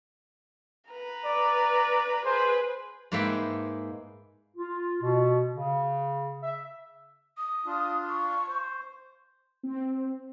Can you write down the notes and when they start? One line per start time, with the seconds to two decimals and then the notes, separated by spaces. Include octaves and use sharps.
0.89 B4 A#5
1.25 D5
2.25 G#4 B4 C5
3.12 G#2 G#3 A#3 B4 E5 G5
4.57 F4
5.01 B2
5.54 C#3
6.43 E5
7.37 D#6
7.66 D4 F4
8.09 C#6
8.48 C5
9.63 C4